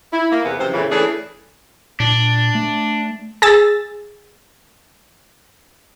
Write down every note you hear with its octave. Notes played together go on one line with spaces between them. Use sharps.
E4
A#3
E2 C3 B3
F#2 C3 E3 F3 C5
F2 A#2 C#3 E3
E3 A3 C#4 D4 G#4 A4
A#2 D4
A3
G#4 E6 A6